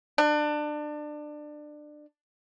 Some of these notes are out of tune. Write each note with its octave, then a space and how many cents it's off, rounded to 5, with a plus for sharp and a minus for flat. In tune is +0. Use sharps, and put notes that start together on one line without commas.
D4 +25